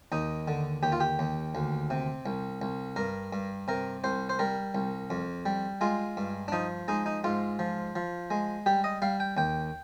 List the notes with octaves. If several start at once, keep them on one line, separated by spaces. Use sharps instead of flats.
D#2 D#4
D3
D#2 G4
F4
G4
D#2
D2
C3
C2
C2
G2 A#4
G2
C3 A#4
C2 C5
C5
G3 A#4
C2
F2
G3
G#3 F4
G2
D4
F3 D#4
G#3 D#4
D#4
G#2 F4
F3
F3
G#3
G3 G4
D#5
G3 F5
G5
D#2 G5